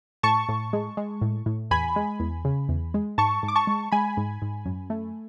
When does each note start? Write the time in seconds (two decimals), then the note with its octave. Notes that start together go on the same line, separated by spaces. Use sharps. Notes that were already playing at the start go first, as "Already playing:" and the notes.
0.23 A2 A5 C#6
0.49 A2
0.73 G#3
0.97 G#3
1.21 A2
1.46 A2
1.71 E2 G#5 B5
1.96 G#3
2.20 E2
2.45 C#3
2.69 E2
2.94 G#3
3.18 G#2 A5 C#6
3.43 G#2
3.48 D6
3.56 A5 C#6
3.67 G#3
3.91 G#3 G#5 B5
4.17 G#2
4.42 G#2
4.66 F#2
4.90 A3